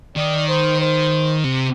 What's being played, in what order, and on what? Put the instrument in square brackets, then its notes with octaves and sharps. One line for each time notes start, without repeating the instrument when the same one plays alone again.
[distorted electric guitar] D#3 [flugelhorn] D5
[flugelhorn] C5
C5
[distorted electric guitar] C3